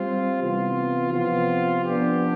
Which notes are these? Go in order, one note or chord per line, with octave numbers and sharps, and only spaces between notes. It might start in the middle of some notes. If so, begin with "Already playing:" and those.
Already playing: G3 C4 F4
C3 E3 B3 F4
C3 F3 B3 F4
F3 B3 D4 G4